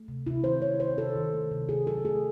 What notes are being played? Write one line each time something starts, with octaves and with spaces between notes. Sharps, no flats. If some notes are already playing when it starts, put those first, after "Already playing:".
Already playing: A3
C3
C3 E4
D#3 C5
A3 C#5
C3 C5
C3 A4
D#3
A3
C3
C3 G#4
F#3 A4
A3 G#4